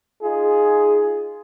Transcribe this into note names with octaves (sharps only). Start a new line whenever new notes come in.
D#4 F4 G#4